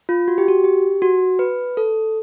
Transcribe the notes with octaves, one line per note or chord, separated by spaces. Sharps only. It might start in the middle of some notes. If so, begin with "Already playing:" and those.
F4
F#4
G4
F#4
G4
F#4
B4
A4